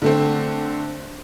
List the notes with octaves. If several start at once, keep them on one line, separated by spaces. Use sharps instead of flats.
D3 A3 C4